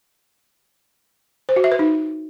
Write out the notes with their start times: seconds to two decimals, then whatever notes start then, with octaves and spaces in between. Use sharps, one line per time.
1.49 C5
1.56 F#4
1.64 E5
1.72 B4
1.79 D#4